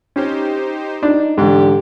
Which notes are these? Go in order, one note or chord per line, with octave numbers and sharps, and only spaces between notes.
C#4 D#4 G4 C5
D4 D#4
E2 G#2 D3 G4